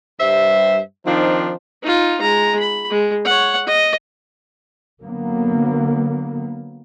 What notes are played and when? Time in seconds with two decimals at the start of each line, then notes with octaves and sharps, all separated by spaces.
0.20 G2 G3 C5 E5
1.05 D#3 F3 C4 D4 D#4 F4
1.83 D#4 F4
2.21 G#3 A#5
2.60 B5
2.90 G#3
3.25 C#5 F#5
3.67 D#5
5.01 D3 F#3 A#3 B3